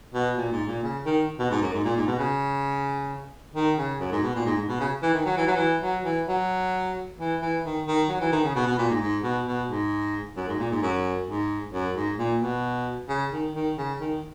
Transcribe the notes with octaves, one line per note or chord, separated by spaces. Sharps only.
B2
A#2
G#2
A#2
C#3
D#3
B2
G#2
F#2
G#2
A#2
G#2
B2
C#3
D#3
C#3
F#2
G#2
B2
A#2
G#2
G#2
B2
C#3
E3
D#3
F#3
E3
F#3
E3
F#3
E3
F#3
E3
E3
D#3
D#3
F#3
E3
D#3
C#3
B2
B2
A#2
G#2
G#2
B2
B2
G#2
F#2
G#2
A#2
G#2
F#2
G#2
F#2
G#2
A#2
B2
C#3
D#3
D#3
C#3
D#3